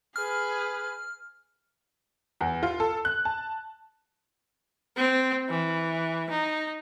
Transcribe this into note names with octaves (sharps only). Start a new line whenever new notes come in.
G#4 B4 F6
E2
F4
A4
F#6
A5
C4
E3
D#4